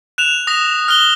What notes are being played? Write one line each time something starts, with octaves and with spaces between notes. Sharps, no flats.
F#6 E7 F7
D#6 A#6
F6 F#6 G7